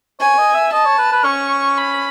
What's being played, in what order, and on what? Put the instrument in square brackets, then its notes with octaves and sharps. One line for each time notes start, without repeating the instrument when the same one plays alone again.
[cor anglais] C#5 [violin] G#5
[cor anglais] D#5
E5
[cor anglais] D#5 [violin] A5
[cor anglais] C#5
B4
B4
[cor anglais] C#4 [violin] C#6
[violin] B5